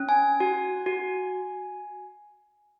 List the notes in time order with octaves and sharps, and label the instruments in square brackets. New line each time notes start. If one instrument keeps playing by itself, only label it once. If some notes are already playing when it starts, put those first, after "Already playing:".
Already playing: [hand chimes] C#4
G#5
F#4
F#4